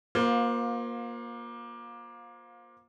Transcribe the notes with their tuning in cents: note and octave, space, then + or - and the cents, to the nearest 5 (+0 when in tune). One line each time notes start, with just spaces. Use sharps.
A#3 +20 F4 +30 C5 -5